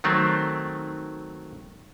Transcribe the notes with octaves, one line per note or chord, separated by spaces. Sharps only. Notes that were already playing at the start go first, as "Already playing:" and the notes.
D#3 F#3 A3 C4